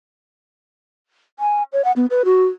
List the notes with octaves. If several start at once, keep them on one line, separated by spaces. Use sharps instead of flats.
G#5
C#5
F#5
B3
B4
F#4